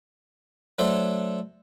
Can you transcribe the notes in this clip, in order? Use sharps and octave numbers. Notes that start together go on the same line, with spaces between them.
F#3 A3 D4 A4 C5